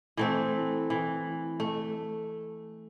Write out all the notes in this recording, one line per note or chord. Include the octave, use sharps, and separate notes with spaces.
E3 A3 C4
E3
A3